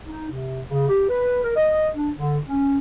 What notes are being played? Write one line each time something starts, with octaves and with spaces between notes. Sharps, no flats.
D#4
C3
C#3
G4
B4
A#4
D#5
D4
D3
C#4